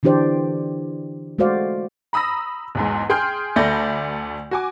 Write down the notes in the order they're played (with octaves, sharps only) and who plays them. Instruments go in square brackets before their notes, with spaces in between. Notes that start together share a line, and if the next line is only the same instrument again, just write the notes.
[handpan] D3 E3 D4 G4 C5 D5
G#3 A3 F#4 C5 D5 F5
[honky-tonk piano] A#5 B5 D#6 E6 A#6
B1 E2 G#2
G#4 G5 C6 F6 G6
D2 A3 D5 B5 G6 A#6
F#4 G#5 D6